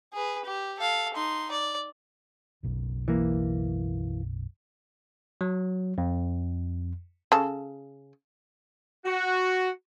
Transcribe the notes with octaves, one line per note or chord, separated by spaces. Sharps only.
G#4 B4
G4
A4 F5
D#4 C6
D5
F#1 B1 F#2
E3 A#3
F#3
F2
C#3 A4
F#4